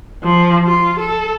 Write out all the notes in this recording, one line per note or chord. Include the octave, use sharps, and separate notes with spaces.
F3
F4
A4